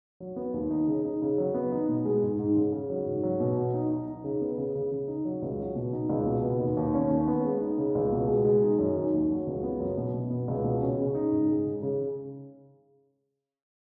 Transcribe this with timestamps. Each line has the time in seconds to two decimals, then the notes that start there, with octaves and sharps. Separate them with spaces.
0.20 F#3
0.36 B3
0.54 D#2
0.70 D#4
0.87 C#3
1.05 D#4
1.21 C#3
1.38 F#3
1.54 B3
1.72 D#4
1.88 B2
2.05 G#3
2.23 G#2
2.39 G#2
2.56 C#3
2.72 C#3
2.90 F#3
3.06 G#2
3.23 F#3
3.40 B2
3.57 F#3
3.74 D#4
3.90 D#4
4.08 D#4
4.24 C#3
4.41 B3
4.57 C#3
4.75 C#3
4.92 C#3
5.08 D#4
5.25 F#3
5.42 C#2
5.59 F#3
5.76 B2
5.93 D#4
6.09 C#2
6.26 B2
6.43 B3
6.60 D#2
6.77 D#2
6.94 C#4
7.11 D#2
7.28 B3
7.45 G#3
7.61 D#4
7.78 C#3
7.95 C#2
8.12 B2
8.28 G#3
8.45 G#3
8.62 D#4
8.79 F#2
8.96 D#3
9.13 D#2
9.30 F#3
9.47 C#2
9.63 B3
9.80 F#2
9.97 B2
10.14 B2
10.30 B3
10.48 C#2
10.64 B2
10.82 C#4
10.98 C#3
11.15 D#4
11.32 G#2
11.48 G#3
11.65 C#3
11.82 C#3